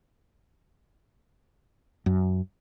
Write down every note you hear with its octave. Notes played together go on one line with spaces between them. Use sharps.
F#2